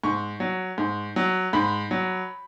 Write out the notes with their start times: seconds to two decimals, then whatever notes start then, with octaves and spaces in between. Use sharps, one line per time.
0.04 G#2 C#6
0.40 F#3
0.78 G#2
1.16 F#3
1.53 G#2 B5
1.91 F#3